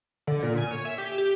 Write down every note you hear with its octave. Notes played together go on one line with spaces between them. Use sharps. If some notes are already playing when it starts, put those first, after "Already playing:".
D3
A#2
G#5
C#5
E5
G4
G4